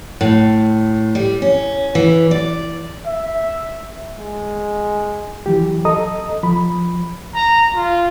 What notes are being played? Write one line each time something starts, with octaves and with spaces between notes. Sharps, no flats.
A2
G3
C#4
E3
D5
E5
G#3
E3 F#3 G4
A4 D#5 A#5 D#6
F3 B5
A#5
F4